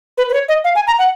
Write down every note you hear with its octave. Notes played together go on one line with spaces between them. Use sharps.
B4
B4
C#5
D#5
F5
G#5
A#5
F#5